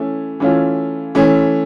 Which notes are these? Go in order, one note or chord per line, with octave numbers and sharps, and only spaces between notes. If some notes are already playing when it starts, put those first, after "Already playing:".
Already playing: E3 A3 C#4
E3 A3 C#4 F4
E3 A3 C#4